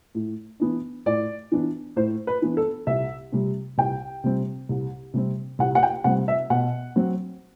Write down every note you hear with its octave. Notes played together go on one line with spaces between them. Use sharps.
A2
E3 B3 D4
A2 D5
E3 B3 D4
A2 C5
B4
E3 B3 D4
A4
C2 E5
C3 G3 C4
C2 G5
C3 G3 C4
C2
C3 G3 C4
C2 F#5
F#5
G5
C3 G3 C4 F#5
E5
B2 F#5
F#3 C4